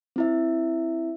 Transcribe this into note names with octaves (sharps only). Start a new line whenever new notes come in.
C4 E4 E5